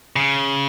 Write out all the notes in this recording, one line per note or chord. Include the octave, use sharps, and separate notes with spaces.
C#3